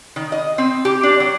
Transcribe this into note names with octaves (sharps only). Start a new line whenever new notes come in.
D#3
D#5
C4
G4
D4
F#3